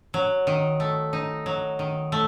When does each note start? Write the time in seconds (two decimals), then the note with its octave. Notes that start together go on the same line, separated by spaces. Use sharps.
0.14 F#3
0.47 D#3
0.80 A3
1.13 D#4
1.46 F#3
1.79 D#3
2.12 A3